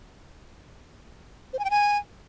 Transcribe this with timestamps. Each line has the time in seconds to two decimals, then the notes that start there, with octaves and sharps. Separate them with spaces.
1.53 C5
1.59 G#5
1.65 G5
1.70 G#5